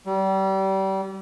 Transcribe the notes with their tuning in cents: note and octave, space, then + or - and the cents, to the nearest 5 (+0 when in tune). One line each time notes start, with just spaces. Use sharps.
G3 -30